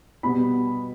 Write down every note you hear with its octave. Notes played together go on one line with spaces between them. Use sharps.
B2 G3 B3 B5